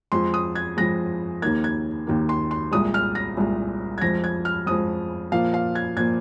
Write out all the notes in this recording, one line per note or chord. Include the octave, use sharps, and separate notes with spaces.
F2 F3 G#3 C6
D#6
G#6
F2 F3 G#3 A#6
D#2 D#3 A#3 G#6
G#6
D#2 D#3 A#3
C6
C6
C2 A#2 G#3 D#6
F6
A#6
C2 A#2 G#3
G#6
F2 F3 G#3 A#6
G#6
F6
F2 F3 G#3 D#6
A#2 F3 A#3 F5
F5
G#6
A#2 F3 A#3 G#6